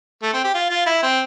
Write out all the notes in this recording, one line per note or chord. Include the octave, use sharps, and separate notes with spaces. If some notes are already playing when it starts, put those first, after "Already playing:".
A3
C4
G4
F4
F4
E4
C4